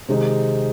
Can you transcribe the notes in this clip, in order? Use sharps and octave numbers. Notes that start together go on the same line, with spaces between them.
C3 D#3 G#3 C4 D#4